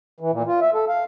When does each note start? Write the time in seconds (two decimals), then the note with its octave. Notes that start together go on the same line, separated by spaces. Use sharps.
0.20 E3
0.32 A#2
0.46 F4
0.61 E5
0.74 A4
0.89 F5